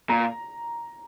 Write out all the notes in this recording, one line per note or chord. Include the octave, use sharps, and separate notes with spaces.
A#2 A#5